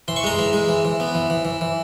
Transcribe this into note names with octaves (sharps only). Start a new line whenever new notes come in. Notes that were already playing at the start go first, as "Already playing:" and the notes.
E3 C6
C#6
G#3 A#5 C6
E3
G#3
E3
E3
B3
E3
E3
E3
E3